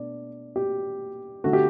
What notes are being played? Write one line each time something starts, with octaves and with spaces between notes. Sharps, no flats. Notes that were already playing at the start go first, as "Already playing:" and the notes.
Already playing: B2 A3 D4 D5
G4
D3 A3 F#4
G4